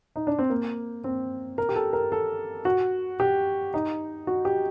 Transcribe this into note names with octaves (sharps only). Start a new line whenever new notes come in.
D#4
D4
C4
A#3
C4
A#4
G4
A4
A#4
A4
F#4
G4
D#4
F#4
G4